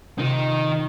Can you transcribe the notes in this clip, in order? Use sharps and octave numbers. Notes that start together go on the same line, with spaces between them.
C3 D#3 D#4 F4 E7